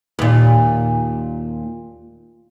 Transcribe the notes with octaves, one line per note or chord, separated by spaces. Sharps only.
D#2 A#2